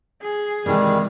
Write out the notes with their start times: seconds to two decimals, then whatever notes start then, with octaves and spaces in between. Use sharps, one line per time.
0.23 G#4
0.66 C3 D#3 E3 G3 G#3